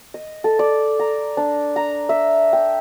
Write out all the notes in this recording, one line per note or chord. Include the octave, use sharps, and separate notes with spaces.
D#5
A4
D5
A#5
D4
A#5
E5
G5